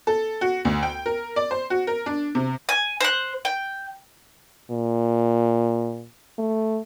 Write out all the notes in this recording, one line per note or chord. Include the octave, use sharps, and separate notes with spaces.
A4
F#4
D2
G5
A#4
D5
C5
F#4
A#4
D4
C3
G#5
C5 F#6
G5
A#2
A3